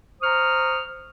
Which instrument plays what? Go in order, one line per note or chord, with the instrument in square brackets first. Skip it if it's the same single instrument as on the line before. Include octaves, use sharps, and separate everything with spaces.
[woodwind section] C5 A#5 C#6 D#6 F6